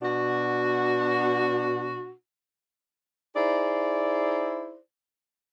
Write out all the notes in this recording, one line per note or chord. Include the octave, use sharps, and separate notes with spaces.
B2 D4 F#4
D#4 E4 G#4 C5 D5